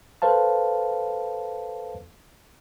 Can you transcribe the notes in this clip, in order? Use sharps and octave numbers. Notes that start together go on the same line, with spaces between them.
A4 B4 C5 F5 A5